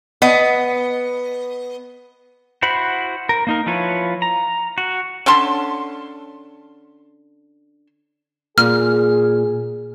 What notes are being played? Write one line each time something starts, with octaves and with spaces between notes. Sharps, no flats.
B3 D#5
E4 F#4 C5 F#5 B5
A#4
A#3 D#4 A#4
F3 E4 F4 B4 C#5
A#5
F#4
D3 C#4 A5 C6
A#2 G#4 F6